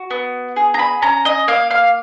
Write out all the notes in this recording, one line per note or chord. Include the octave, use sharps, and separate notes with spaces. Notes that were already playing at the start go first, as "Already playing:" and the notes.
Already playing: F#4
B3
G#4
A#5
B5
C#4 A#5
D#5
A#3 F5
F5